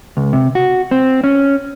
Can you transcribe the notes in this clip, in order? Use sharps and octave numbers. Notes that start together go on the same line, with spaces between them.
C#2
C3
F#4
C4
C#4